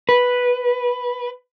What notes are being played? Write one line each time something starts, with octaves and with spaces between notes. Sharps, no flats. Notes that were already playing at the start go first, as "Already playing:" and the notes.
B4